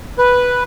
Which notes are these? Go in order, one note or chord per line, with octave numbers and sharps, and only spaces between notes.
B4